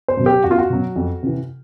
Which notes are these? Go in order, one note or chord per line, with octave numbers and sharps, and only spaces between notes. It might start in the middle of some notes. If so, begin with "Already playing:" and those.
C5
B2 F#3
G4
E2 F#4
F4
F#4
B2 F#3
F2
C3 E3